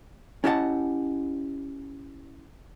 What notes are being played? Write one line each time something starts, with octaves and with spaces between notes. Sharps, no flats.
C#4 E4 G4 D#5 F#5 A5